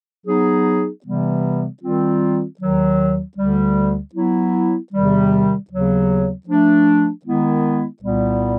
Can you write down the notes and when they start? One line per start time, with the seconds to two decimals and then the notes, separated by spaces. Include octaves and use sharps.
0.26 F#3 B3 D#4 G#4
1.05 C3 E3 G3 B3
1.82 D#3 G3 C4 F4
2.60 D#2 D#3 F#3
3.37 D2 D3 G3
4.14 F#3 B3 E4
4.93 E2 C3 D#3 G3
5.70 D#2 C#3 F#3 B3
6.47 F3 A3 D4
7.24 D#3 G#3 B3 E4
8.02 C2 A#2 G3 B3